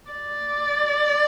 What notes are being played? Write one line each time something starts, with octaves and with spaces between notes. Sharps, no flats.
D5